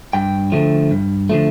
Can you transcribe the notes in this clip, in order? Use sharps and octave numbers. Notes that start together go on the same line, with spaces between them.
G2 G5
D3 F3 A3
G2
D3 F3 A3